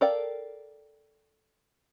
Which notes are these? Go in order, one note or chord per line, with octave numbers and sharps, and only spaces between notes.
A4 A#4 D5 F5 G5